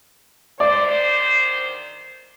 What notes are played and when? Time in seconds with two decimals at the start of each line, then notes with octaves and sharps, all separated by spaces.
0.60 D2 D#3 C5 D5